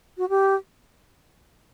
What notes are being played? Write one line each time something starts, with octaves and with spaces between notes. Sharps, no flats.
F#4
G4